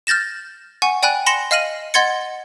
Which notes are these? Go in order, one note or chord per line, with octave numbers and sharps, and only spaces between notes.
F6 G6 A6 A#6 E7
F#5 G#5 C#6
D5 G5 G#5 B5 F#6
B5 C6 A#6 C#7 E7
D#5 F5 F6 A#6 D#7 F#7
D#5 F#5 C6 G#6 A6 C#7